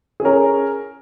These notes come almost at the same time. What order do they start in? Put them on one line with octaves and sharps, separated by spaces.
G#4 C#4 A#4